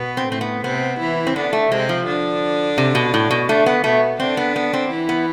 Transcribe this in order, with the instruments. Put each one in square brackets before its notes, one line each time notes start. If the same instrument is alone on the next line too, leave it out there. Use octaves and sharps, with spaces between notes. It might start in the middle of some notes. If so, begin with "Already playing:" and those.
Already playing: [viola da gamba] B2 B3
[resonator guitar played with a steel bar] C4
[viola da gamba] A2 A3 [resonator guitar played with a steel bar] C4
[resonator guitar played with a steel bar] B3
[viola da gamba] C3 C4 [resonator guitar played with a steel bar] B3
[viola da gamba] E3 E4
[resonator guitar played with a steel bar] C4
[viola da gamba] D3 D4 [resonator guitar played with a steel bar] B3
[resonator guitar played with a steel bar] A3
[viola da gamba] C3 C4 [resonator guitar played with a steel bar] G#3
[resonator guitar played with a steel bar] F3
[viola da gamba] D3 D4
[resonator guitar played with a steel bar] C3
B2
A2
B2
[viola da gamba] D3 D4 [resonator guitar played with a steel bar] A3
[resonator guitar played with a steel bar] B3
[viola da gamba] B2 B3 [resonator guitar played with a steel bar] A3
[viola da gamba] D3 D4 [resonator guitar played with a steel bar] C4
[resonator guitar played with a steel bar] B3
B3
C4
[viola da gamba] E3 E4
[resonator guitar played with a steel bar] B3